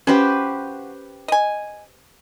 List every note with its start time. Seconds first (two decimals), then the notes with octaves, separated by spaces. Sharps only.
0.07 F3 C#4 F#4 G4 B4 C5
1.28 D#5 G#5